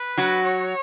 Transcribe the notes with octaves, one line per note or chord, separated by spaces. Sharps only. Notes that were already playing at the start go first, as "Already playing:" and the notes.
Already playing: B4
F#3 F#4
C#5